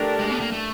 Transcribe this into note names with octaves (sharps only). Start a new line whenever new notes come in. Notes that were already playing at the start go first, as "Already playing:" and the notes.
Already playing: A3 D4 G4 A#4
G#3
B3
A#3
A3